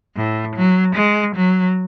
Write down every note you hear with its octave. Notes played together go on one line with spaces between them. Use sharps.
A2
F#3
G#3
F#3